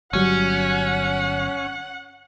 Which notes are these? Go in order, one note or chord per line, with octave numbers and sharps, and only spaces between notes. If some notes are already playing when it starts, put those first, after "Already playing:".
G1 F#3 G3 C#4 F#5